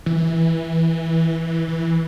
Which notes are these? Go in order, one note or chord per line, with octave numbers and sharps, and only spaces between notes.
E3
E3